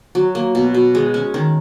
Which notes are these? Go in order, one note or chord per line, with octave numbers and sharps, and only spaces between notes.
F#3
A#3
B2
B2
G#3
C#4
D#3